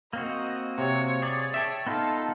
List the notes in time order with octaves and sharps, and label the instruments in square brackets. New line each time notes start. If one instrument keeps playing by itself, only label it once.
[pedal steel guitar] A#3 C4 F#4 [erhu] D#5
[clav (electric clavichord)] C3 [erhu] C#5
[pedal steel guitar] G#4 D5 [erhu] C#5
[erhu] C#5 [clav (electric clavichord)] E5 G5 A5
[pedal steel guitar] B3 D#4 F4 [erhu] A4